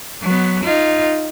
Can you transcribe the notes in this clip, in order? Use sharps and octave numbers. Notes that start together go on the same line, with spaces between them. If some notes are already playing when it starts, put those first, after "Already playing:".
F#3 B3
D#4 F4